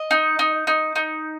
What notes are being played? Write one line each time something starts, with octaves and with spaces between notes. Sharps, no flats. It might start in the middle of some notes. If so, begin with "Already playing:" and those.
Already playing: D#5
D#4
D#4
D#4
D#4